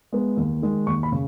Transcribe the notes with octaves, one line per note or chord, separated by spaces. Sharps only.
G#3 B3
D#2
D#3 G#3
D#2 C#6
B5
C#3